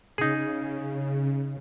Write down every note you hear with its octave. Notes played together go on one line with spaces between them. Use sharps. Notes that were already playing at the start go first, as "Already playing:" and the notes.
C#3 D#4 G#4